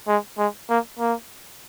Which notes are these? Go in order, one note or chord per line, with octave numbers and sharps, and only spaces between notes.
G#3
G#3
A#3
A#3